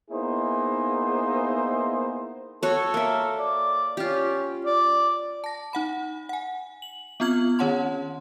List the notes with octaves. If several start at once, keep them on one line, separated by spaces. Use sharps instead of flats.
A#3 B3 D#4 E4 G#4 C5
F#4 A4 C#5
A#3 E5
D5
C#4 F4 G4
D5
A5 A#6
D#4 F#5 B5
F#5 G#5
F#7
B3 C4 F4 F6 G#6 F#7
D#3 C#4 C#5 F#5 A5 C6